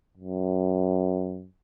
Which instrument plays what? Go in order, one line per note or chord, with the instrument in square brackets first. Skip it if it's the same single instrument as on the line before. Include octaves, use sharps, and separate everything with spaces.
[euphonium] F#2